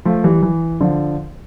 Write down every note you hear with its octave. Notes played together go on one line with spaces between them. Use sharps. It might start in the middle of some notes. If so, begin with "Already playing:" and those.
F3 A3
E3 G3
E3
D3 F3